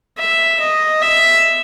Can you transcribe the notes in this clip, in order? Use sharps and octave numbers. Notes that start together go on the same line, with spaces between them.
E5
D#5
E5